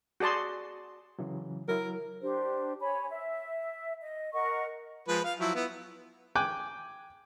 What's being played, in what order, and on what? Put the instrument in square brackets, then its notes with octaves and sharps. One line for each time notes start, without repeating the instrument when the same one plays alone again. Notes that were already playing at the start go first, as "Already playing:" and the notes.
[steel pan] F#4 G#4 D5 A5 C6
[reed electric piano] C#3 E3 F#3
[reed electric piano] F#3 E4 [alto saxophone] A#4
[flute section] D4 G4 C5
C#5 G#5 B5
E5
D#5
A#4 D#5 F#5 C#6
[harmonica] F3 G#3 B4
F5
F3 F#3 E4
B3 E4
[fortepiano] G5 G#5 D6 F#6